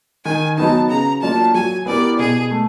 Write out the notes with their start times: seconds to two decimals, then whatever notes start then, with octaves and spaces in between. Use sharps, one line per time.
0.24 D#3 G#5
0.57 F#3 B3 D#4 A5
0.89 C#3 A#5
1.22 F#3 A#3 D4 F4 A5
1.54 F#3 G#5
1.86 B3 E4 G4 A#4 D5
2.19 B2 G#4
2.51 A3